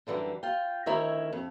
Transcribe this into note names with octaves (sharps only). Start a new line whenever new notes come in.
F#2 D3 E3 G3
F4 G5
D2 D#3 E4 A#4 C#5 E5
F2